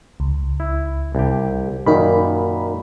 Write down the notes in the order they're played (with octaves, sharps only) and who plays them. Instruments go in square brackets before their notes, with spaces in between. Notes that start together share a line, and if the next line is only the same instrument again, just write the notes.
[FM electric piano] C#2
[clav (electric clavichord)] E4
C2 G4
[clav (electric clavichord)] F#2 A#2 D#3 [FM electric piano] D#4 A#4 B5